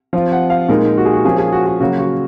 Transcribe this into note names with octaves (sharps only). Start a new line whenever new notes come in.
F3 C4 F4
F#5
F5
A#2 G#3 D#4 A#4
F#4
G#4
F#4
F3 A#3 C#4 F4 G#4
G#4
F#4
F#4
C#3 F#3 A#3 F#4
F#4